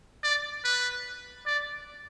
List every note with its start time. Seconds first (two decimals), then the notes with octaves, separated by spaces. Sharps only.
0.23 D5
0.64 B4
1.46 D5